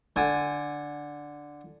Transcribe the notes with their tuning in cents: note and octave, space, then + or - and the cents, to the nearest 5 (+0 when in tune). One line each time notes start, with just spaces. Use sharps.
D3 +0 G#5 +0